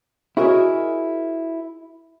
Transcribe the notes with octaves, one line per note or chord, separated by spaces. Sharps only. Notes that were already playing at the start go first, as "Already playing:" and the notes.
E4 F#4 G#4 A#4 C#5 D#5